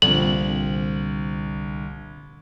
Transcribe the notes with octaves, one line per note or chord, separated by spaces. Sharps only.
C2 A#2 D3 F3 C4 F#7